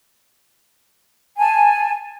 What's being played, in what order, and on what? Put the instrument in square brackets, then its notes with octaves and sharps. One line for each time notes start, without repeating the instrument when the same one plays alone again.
[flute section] G#5 A5